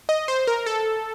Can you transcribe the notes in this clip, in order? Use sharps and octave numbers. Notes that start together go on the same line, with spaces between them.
D#5
C5
A#4
A4